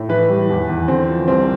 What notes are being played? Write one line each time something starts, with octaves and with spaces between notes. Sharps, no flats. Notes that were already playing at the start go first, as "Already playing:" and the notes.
Already playing: A2
E3 B4
G3
E2
E2
D3 C4
F3
C2 C4